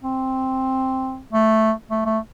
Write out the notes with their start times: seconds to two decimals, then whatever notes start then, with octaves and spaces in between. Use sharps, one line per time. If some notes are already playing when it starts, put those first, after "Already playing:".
0.02 C4
1.33 A3
1.91 A3
2.06 A3